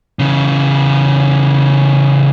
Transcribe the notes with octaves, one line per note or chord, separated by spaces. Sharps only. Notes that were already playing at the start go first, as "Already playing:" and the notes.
C#3 E3